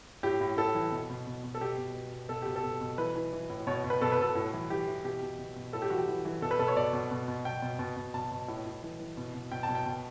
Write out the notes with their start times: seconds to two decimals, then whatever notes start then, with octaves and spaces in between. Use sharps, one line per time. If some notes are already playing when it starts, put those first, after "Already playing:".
0.23 A2 G4
0.41 A2
0.57 A2 A4
0.75 E3
0.92 B2
1.10 B2
1.27 B2
1.44 B2
1.55 A4
1.61 B2 G4
1.78 B2
1.95 B2
2.13 B2
2.29 B2 A4
2.42 B2 G4
2.56 A4
2.64 B2
2.81 B2
2.98 E3 B4
3.15 E3
3.33 E3
3.50 A2
3.67 B2 C#5
3.84 B2
3.90 B4
4.01 B2 A4
4.12 B4
4.18 B2 A4
4.35 A2
4.53 E3
4.70 E3 G4
4.87 E3
5.04 B2 G4
5.22 B2
5.38 B2
5.56 B2
5.73 A2 A4
5.82 G4
5.90 E3 F#4
5.99 G4
6.08 E3
6.25 E3
6.42 B2 A4
6.51 B4
6.59 B2 A4
6.68 C#5
6.76 B2 D5
6.93 B2
7.11 B2
7.28 B2
7.45 B2 G5
7.62 B2
7.79 B2
7.96 B2
8.14 B2 A5
8.31 B2
8.48 A2
8.66 A2
8.83 E3
9.00 E3
9.17 B2
9.34 B2
9.51 B2 G5
9.63 A5
9.69 B2
9.75 G5
9.86 B2